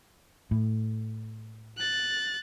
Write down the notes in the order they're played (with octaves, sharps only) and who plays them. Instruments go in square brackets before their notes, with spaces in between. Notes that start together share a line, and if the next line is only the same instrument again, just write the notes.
[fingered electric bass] A2
[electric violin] F#6 A6